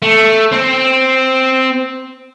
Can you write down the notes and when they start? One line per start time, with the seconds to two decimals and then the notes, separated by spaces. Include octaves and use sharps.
0.02 A3
0.53 C4